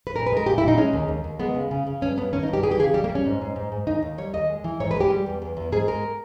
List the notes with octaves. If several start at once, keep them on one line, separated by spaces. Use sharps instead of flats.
B4
A#2 A#4
B4
G#3 A#4
A#2 G4
E4
A#2
D#4
G#3 C#4
D#2
D#2
D#2
G#3 B3
C#3
C#3
C#3
G2 C#4
G2 B3
D#3 C#4
D#4
G2
G4
E3 G#4
G4
C#3 G#4
G3 G4
A#3
G3
C#4
G#2
G#2
G#2
G#2
D#2 D#4
D#2
G3 C#5
D#2 D#5
G#3
E3
G#2 C#5
B4
G#3 G4
G3
E2
E2
E2
G#2 G#4
G#3 A#4